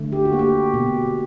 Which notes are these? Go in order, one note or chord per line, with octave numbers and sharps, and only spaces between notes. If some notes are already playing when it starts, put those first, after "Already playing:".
Already playing: D3 A3
G4
F#4
A#3
G4
B2